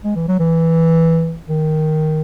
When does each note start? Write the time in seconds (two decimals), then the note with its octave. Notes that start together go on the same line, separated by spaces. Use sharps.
0.04 G#3
0.16 E3
0.28 F#3
0.40 E3
1.49 D#3